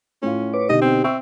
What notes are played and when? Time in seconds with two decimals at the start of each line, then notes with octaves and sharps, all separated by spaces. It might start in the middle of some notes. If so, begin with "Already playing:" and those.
0.22 A2 C#4 F4
0.53 B4 C#5 D6
0.69 B2 D3 D#4 G4 D#5
0.82 C4
1.04 C4 E5 C#6 E6